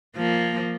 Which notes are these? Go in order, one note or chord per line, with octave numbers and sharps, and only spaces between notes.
F3 A#3